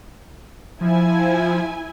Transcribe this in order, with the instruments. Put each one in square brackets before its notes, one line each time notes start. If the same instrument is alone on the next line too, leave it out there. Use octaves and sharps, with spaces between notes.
[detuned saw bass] F3 [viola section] E4 G#5